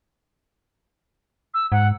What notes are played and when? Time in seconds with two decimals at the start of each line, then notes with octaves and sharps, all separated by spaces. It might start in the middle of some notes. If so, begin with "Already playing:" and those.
1.54 E6
1.72 G#2 F#5